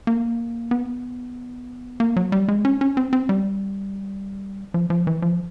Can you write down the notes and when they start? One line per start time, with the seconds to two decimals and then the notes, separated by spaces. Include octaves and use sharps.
0.07 A#3
0.71 B3
2.00 A#3
2.16 F#3
2.32 G3
2.48 G#3
2.65 C#4
2.81 C#4
2.97 C4
3.13 C4
3.29 G3
4.74 F3
4.90 F3
5.07 E3
5.22 F3